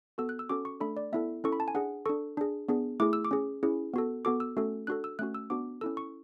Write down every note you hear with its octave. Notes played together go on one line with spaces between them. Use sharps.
B3 F#4 A4 E6
F#6
E6
C#4 F#4 A4 D6
C#6
A3 D4 A4 B5
D5
B3 E4 A4 E5
C#4 E4 A4 C#6
B5
A5
G#5
D4 G#4 F#5
D4 A4 C#6
D4 G#4
B3 D4 G#4
A3 E4 G#4 D6
E6
D6
C#4 G#4
C#4 E4 G#4
B3 F#4 A4
B3 F#4 A4 D6
E6
A3 C#4 F#4 A4
D4 F#4 A4 F#6
E6
A3 C#4 F#4 F#6
E6
B3 D4 F#4 D6
C#4 E4 A4 E6
C#6